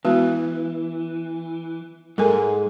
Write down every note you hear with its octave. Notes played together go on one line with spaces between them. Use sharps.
E3 G#3 B3 F#4
G#2 G#3 A4 A#4 G#5